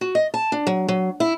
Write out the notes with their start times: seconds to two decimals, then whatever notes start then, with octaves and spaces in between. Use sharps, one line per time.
0.01 F#4
0.15 D#5
0.34 A5
0.52 D4
0.67 F#3
0.88 F#3
1.20 E4